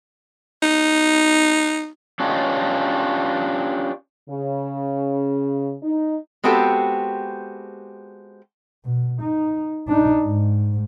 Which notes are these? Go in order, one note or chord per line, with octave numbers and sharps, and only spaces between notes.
D#4
C#4 D4 F4 G4 C#5 D#5
C#3
D#4
G#3 B3 C4 F#4 G4 A4
B2
D#4
D4 D#4
G#2